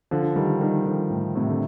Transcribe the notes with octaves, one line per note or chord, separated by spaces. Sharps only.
D3 F3
D#3 G3
D#3 G3
D3 F3
A2
A2 C3
D3